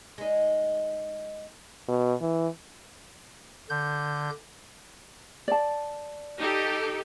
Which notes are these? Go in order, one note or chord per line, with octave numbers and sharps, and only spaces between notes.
G#3 D#4
B2
E3
D3 G6
D5 A5
D#4 G4 A4